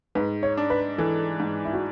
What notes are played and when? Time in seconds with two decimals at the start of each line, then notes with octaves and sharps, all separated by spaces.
0.15 G#2 B4
0.43 C#5
0.57 D4
0.70 B4
0.98 E3 A4
1.40 G#2
1.65 E4
1.73 F#4